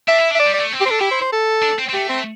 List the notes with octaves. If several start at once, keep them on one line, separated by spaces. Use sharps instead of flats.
D4 E5
E4
D4 E5
D5
G3
D5
A3
C4
G4
D4 A4 C5
E4 G4
C5
C5
A4
D4
C4
C4
A3 G4
C4